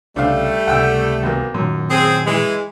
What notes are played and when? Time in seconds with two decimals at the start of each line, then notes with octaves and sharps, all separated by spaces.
0.16 C2 C#3 G3 A3 D4 F5
0.67 C#2 C3 F#5 G5 E6
1.23 B1 A#3
1.54 F#2 A#2 D#3 F#3
1.89 C4 G#4
2.25 E3 G#3